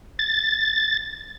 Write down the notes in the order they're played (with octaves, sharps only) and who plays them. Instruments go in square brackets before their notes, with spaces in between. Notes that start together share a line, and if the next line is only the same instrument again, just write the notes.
[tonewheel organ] A6